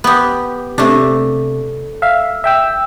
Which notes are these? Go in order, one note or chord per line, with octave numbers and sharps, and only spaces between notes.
B3 G4
C3 A3 D4
E5 F5
E5 G5 E6